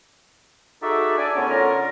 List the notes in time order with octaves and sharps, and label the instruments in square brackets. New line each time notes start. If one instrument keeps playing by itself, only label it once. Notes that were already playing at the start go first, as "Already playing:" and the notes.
[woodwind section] D#4 F#4 G#4 A4 D5 E5
D4 D5 G#5
F#2 A2 B3 C#4
D3 C#4 F4 A4 A#4